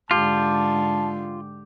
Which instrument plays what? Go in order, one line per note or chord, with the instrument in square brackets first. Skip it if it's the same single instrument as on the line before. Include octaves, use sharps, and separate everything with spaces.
[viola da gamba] G#2 D3 [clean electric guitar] F4 [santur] G4 [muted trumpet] A5